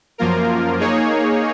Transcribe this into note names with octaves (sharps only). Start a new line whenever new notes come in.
F#2 F3 A#3 F4 A#4
A#3 D#4 G#4 C#5